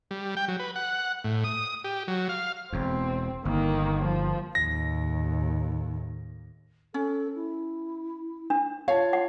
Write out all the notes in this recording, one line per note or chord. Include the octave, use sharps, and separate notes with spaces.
G3
G5
F#3
B4
F#5
A2
D#6
G4
F#3
F5
E1 E2 C4
G1 D#3 A#3
F3
D#2 A2 A#6
C#4 A4
E4
D4
F4 C#5 F5 A5
F#5